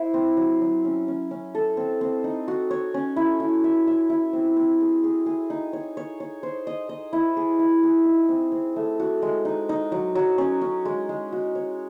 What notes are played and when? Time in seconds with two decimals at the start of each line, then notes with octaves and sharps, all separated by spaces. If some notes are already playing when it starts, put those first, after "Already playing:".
Already playing: E4 C5
0.14 C4
0.37 F#3
0.61 F#3
0.85 C#4
1.08 C#4
1.31 C#4
1.55 A4
1.77 C4
2.01 C4
2.24 D#4
2.48 F#4
2.71 C#5
2.94 C#4
3.16 E4
3.40 E4
3.64 E5
3.87 E5
4.10 E4
4.33 C4
4.57 C4
4.81 G#4
5.04 G#4
5.26 G#4
5.50 D#4
5.73 C#5
5.97 C#5
6.20 C#5
6.43 C5
6.67 D#5
6.89 D#5
7.13 E4
7.37 G#4
7.59 E4
7.83 G#4
8.05 D#4
8.29 C4
8.52 C4
8.76 A3
9.00 F#4
9.22 G#3
9.45 D#4
9.69 D#4
9.92 F#3
10.15 F#3
10.38 C#4
10.61 C#4
10.85 G#3
11.09 G#3
11.32 F#4
11.55 C#5